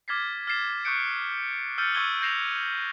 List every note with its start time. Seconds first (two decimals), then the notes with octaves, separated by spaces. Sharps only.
0.08 D6 F6 G#6 A6 B6 C7
0.47 F6 A6 C7 E7
0.85 C#6 D#6 F#6 G6 C#7 D7
1.78 E6 F6 G6 A6 C#7 D#7
1.95 C#6 E6 F#6 G#6 D#7 G7
2.22 G6 A#6 C7 E7 F7